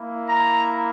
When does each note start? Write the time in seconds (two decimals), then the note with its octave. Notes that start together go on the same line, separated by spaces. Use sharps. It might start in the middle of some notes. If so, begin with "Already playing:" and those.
Already playing: A#3 E4
0.28 A#5